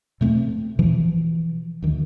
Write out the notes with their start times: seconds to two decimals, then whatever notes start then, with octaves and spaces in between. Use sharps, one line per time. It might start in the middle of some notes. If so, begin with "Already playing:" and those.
0.21 B2 A3 B3 C4
0.79 B2 E3 F3
1.82 D2 D#3